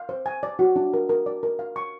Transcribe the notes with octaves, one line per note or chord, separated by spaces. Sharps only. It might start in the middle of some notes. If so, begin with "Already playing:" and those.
Already playing: F5
C5
G#5
D5
F#4
D4
A#4
A#4
D5
A#4
F5
C#6